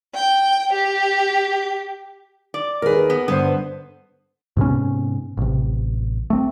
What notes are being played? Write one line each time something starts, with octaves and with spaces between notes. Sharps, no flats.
G5
G4
D5
D#2 G#4 A#4 B4
B3
G2 D3 B3 C5
G#2 C3 B3 C#4
A1 C3
A3 C4